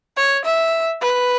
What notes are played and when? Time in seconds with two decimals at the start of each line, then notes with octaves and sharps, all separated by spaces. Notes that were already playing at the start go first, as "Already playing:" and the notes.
0.17 C#5
0.45 E5
1.01 B4